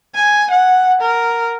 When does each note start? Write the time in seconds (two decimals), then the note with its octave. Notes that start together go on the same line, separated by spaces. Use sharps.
0.15 G#5
0.51 F#5
1.01 A#4